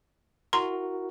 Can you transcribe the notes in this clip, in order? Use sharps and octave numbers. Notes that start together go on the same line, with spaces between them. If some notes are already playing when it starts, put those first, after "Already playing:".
E4 F#4 A#4 A#5 C6